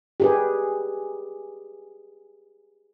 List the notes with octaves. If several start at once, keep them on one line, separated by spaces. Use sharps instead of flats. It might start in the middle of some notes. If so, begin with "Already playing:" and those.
G4 G#4 B4